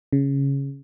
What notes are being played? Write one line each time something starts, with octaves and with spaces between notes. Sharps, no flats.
C#3